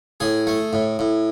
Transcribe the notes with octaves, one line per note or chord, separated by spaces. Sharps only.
A2 G#4
A3
A2
A2